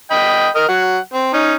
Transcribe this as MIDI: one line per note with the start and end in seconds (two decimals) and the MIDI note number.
0.11 0.48 75
0.11 0.48 79
0.11 0.48 83
0.55 0.65 70
0.55 0.65 75
0.68 0.97 54
0.68 0.97 78
1.13 1.31 60
1.34 1.54 61
1.34 1.54 63